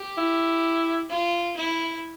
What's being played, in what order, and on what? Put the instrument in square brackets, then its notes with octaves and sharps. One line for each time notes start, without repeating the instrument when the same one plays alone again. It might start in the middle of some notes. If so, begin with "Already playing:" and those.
Already playing: [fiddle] G4
[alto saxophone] E4
[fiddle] F4
E4